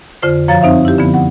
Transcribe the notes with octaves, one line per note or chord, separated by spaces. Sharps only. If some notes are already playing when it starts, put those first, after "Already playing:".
F2 D3 F4 C5
F#2 F3 C#5 F5 A#5 A6
C4 D#4 C5 E5 F5
E4 G4
D3 F3 B3
F#5